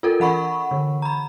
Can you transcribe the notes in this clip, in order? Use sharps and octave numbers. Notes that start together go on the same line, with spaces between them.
F4 A4 A#4
E3 F#5 B5 C#6
D3
A#5 B5